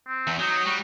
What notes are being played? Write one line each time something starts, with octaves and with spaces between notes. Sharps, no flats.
C4
E2
F#3 D#4
G3 F#4